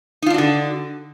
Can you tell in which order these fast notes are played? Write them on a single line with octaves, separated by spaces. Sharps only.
D#4 F4 D4 F#4 D3